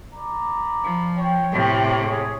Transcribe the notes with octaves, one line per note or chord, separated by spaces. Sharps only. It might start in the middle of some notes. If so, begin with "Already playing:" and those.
D5 A#5 B5
F3
C#5 G5
A2 C3
G#4 C#5